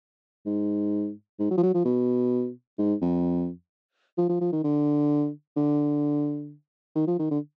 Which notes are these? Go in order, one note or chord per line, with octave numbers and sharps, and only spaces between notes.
G#2
G#2
F#3
F3
F#3
F3
B2
G#2
F2
F3
F3
F3
D#3
D3
D3
D#3
F3
D#3
D3